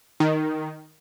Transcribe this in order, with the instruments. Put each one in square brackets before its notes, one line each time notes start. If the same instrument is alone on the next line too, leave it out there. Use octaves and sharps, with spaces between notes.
[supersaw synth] D#3